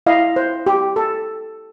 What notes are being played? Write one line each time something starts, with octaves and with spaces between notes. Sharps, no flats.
E4 D#5 F5
C5
G4
A4